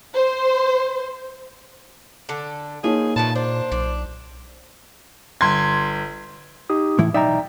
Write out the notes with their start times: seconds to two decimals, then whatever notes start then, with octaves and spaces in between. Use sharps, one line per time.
0.15 C5
2.29 D3 A4
2.84 F3 A#3 D#4 G#4 C#5
3.16 A#2 F3 A3 B4 A5
3.35 D4 C5
3.72 B1 D4
5.41 G1 C6 G#6
6.70 D#4 G4 D#6
6.99 A2 E3 E4
7.14 B1 D#4 D5 E5 G5 A#5